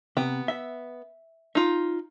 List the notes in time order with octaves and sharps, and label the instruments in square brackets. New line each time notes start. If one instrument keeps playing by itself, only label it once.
[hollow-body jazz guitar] C3 [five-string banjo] B3 G5
[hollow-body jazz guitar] E5
[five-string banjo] D#4 F4